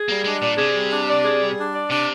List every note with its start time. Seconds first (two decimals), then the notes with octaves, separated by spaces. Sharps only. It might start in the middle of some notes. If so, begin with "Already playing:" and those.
Already playing: G#4
0.08 G3 A#3
0.24 G#3 D4
0.41 A#2 D5
0.58 C3 G#4
0.75 G3
0.91 D4
1.07 D5
1.24 G#4
1.41 G3
1.56 D4
1.74 D5
1.90 C3 D4